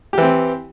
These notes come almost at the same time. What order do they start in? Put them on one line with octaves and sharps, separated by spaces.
G4 E3 C4